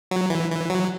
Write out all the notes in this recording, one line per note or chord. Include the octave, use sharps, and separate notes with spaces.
F#3
E3
E3
F#3